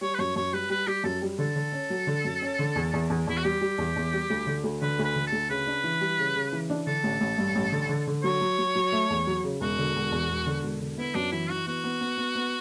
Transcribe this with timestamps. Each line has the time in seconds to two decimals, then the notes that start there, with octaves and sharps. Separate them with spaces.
0.01 G3 C#5
0.14 B4
0.19 F#2 C#5
0.36 F#2 C#5
0.53 G3 B4
0.70 G3 B4
0.87 G3 G4
1.04 F#2 A4
1.22 G3
1.39 D3 A4
1.56 D3
1.72 C#4
1.90 F#3
2.07 D3
2.25 F#2
2.42 C#4
2.59 D3
2.76 E2
2.93 E2
3.10 E2
3.27 E2 E4
3.37 F#4
3.44 G3 G4
3.61 G3
3.78 E2
3.96 E2
4.13 G3
4.30 D2
4.47 D3
4.64 D2
4.82 D3 B4
4.99 D2
5.04 B4
5.16 D3
5.27 A4
5.32 D2
5.50 C#3 B4
5.67 D4
5.84 E3
6.01 G3
6.19 C#3
6.36 C#3
6.53 E3
6.70 D4
6.87 D3 A4
7.04 A1
7.21 A1
7.38 G2
7.55 A1
7.72 D3
7.89 D3
8.07 D3
8.23 F#3 C#5
8.41 F#3
8.59 F#3
8.75 F#3
8.92 A3
9.10 E2
9.27 F#3
9.44 C#3
9.61 E1 F#4
9.78 D3
9.96 E1
10.12 E2
10.30 E1
10.46 D3
10.63 E1
10.81 D3
10.98 B3 E4
11.15 F#2 D4
11.32 E3 E4
11.50 E3 F#4
11.67 B3 F#4
11.84 B3
12.01 B3
12.18 B3
12.35 B3